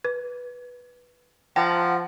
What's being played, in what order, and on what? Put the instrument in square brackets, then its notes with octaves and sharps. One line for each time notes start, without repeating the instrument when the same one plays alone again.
[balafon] B4
[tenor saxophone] F3 [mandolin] F#5 A5 A#5 [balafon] G5